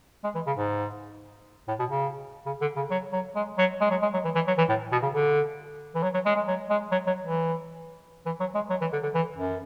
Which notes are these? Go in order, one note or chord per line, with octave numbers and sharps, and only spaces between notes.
G#3
E3
C#3
G#2
A2
B2
C#3
C#3
D3
C#3
F#3
F#3
G#3
F#3
G#3
F#3
G#3
F#3
E3
E3
F#3
E3
A2
B2
C#3
D3
E3
F#3
F#3
G#3
G#3
F#3
G#3
F#3
F#3
E3
E3
F#3
G#3
F#3
E3
D3
D3
E3
F#2